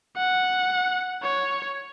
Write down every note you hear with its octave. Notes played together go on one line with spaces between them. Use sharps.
F#5
C#5